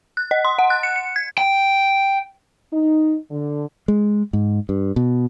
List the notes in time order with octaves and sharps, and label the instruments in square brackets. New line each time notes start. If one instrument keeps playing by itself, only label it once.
[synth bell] F#6
D#5
C6
F#5
F#6
C#7
C#7
G#6
[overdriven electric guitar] G5
[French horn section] D#4
D3
[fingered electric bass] G#3
G#2
G2
B2